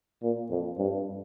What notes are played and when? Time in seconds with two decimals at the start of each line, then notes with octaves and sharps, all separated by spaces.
0.22 A#2
0.50 F2
0.78 G2